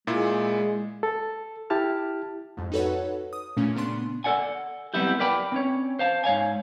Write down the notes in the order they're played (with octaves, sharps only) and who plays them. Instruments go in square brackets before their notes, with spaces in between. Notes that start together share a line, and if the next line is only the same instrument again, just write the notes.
[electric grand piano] A#2 E4 [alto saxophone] G#3
[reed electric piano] A4
E4 G4 A5 F6
[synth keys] F2 G#2
D#4 F#4 A4 B4 C#5 F#5
D#6
A#2 A3 C#4
C#3 B3 D4 C6
[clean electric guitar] A4 A#4 D5 F#5 G#5
F#3 G3 B3 C4 E4 G4
A#4 B4 D5 G5 B5
C4 C#4 C#5
C5 F5 A5
G#2 C#5 F5 G#5